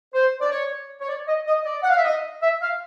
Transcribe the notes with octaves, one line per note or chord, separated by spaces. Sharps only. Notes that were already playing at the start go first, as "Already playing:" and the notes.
C5
D5
C#5
C#5
D5
D#5
D#5
D#5
D5
F#5
F5
E5
D#5
E5
F5